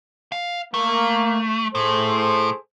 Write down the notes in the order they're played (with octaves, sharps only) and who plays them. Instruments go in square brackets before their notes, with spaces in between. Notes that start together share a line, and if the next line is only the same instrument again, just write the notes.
[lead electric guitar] F5
[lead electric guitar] A3 [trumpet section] A#3
[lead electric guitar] A2 [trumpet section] G#4 A4 C5